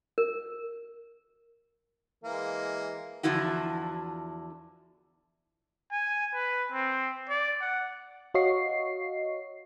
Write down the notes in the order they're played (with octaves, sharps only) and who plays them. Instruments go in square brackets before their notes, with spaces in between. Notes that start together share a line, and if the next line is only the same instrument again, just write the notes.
[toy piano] A#4
[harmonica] E3 G#3 A#3
[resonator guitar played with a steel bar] E2 D3 F3 E4 F#4
[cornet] G#5
B4
C4
D5
F#5
[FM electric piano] F#4 C#5 D#5 F5 C#6 C7